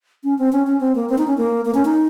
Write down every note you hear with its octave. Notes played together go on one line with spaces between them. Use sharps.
C#4
C4
C#4
C#4
C4
A#3
C4
D#4
C#4
A#3
A#3
C#4
D#4